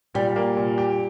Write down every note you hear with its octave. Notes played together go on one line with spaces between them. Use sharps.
A#2 G3
A#3
A#2
G4